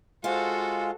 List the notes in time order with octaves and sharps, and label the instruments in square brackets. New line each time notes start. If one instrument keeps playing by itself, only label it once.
[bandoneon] G#3 F4 [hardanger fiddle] F#4 A4 [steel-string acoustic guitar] C5 F5